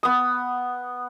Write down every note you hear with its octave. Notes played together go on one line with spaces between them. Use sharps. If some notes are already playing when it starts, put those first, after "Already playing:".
B3 D#6